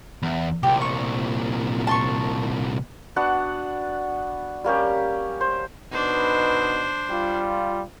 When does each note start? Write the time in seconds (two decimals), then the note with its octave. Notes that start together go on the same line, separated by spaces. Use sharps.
0.23 E2
0.63 C2 A#2 G4
0.81 C#6
1.87 A5 C6 C#6
3.16 B3 D4 F#4 F#5
4.64 G3 A#3 C#4 G4
5.41 C5
5.92 B2 D4 D#4 B4 C5
7.10 G3 F4